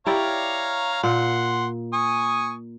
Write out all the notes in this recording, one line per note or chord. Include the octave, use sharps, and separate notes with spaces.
E4 G4 C#5 D5 F5 A#5
A#2 F#5 C6
G#5 C#6 D#6